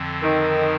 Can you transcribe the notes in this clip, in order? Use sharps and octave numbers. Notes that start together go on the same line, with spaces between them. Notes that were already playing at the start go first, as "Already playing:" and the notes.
Already playing: F2 D3 F3 C4
D#3